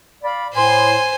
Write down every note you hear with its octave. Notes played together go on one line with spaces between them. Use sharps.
D5 F5 B5
A2 C5 G#5 C6